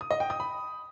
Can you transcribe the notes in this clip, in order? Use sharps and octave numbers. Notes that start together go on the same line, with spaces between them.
D#6
D#5
G5
D#6
B5